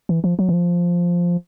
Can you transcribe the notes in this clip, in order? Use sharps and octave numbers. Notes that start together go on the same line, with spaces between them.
E3
F3
F#3
E3
F3